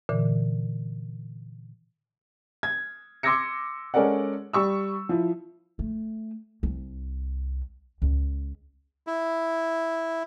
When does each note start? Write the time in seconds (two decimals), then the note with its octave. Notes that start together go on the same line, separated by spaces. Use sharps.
0.09 A#2 D3 E3
2.63 G#6
3.23 C6 D6 E6 G#6 A#6 C#7
3.94 G#3 C#4 A4 A#4 D5 F#5
4.53 G3 C#6 E6
5.09 F3 E4
5.79 A3
6.63 C2
8.02 C#2
9.07 E4